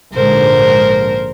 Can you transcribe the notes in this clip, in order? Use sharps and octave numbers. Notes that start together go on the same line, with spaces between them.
A#1 G#2 D3 A#4 C5